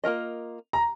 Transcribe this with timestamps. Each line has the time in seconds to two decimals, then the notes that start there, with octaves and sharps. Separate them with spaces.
0.04 A#3 F4 A#4 D#5
0.73 A#5